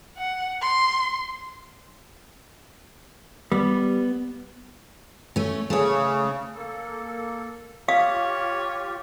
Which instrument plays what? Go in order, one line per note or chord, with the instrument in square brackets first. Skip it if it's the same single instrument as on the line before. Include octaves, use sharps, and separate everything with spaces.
[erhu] F#5
C6
[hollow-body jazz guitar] G3 [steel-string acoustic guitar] B3
[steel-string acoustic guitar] A3 C#4
[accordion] C#3 [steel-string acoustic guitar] A3 C#5
[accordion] A#3 A4
[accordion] F4 G4 [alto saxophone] C#5 [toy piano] F5 D#6